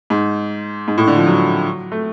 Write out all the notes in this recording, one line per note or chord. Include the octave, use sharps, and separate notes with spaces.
G#2
G#2
A2
D3
F3
F#3
A3